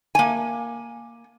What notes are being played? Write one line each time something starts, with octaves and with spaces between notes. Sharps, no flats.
A#3 G#5